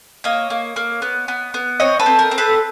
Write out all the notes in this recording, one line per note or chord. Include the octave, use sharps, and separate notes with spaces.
A#3 C#5 D#5
A#3
A#3
B3
B3
B3
C4 C#5 D#5
A4 B4
C4
A#4
C4
A4 B4